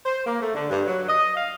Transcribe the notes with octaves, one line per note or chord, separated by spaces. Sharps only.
C5
A#3
A3
D3
G2
F#3
D#5
F5